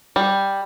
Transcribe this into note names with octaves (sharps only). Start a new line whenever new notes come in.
G3